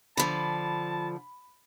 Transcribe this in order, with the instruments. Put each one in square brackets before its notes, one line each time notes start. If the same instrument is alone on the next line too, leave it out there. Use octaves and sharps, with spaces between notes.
[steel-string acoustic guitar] D3 F3 [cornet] A5 [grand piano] B5